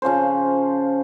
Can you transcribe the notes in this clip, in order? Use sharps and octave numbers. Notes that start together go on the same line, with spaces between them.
C#3 F3 C#4 C5